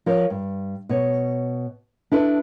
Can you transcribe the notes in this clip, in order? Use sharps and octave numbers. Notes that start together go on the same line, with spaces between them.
F3 A#4 C#5
G2
B2 C#5
D4 E4 A4 B4